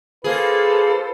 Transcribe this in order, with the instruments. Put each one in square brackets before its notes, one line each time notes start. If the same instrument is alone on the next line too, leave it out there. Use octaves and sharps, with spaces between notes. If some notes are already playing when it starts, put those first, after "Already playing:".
[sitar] A#3 G#4 [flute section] F4 A4 C5 [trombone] B4